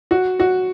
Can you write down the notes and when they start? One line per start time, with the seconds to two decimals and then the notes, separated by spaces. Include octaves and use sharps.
0.11 F#4
0.40 F#4